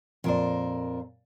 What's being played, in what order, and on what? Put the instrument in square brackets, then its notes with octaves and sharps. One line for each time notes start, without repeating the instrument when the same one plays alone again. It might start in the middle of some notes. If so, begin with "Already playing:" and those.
[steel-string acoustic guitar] F2 A#4 C5 [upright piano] A#2 D5